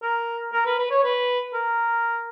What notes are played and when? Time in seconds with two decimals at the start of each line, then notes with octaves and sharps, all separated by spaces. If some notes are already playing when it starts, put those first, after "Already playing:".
0.03 A#4
0.53 A#4
0.65 B4
0.78 B4
0.90 C#5
1.04 B4
1.54 A#4